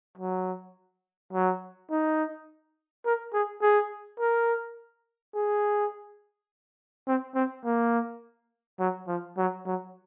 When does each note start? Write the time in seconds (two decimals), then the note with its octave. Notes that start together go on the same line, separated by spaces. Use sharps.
0.18 F#3
1.33 F#3
1.91 D#4
3.05 A#4
3.33 G#4
3.62 G#4
4.20 A#4
5.35 G#4
7.07 C4
7.35 C4
7.65 A#3
8.80 F#3
9.07 F3
9.37 F#3
9.66 F#3